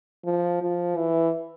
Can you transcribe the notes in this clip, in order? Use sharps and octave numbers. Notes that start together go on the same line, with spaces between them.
F3
F3
E3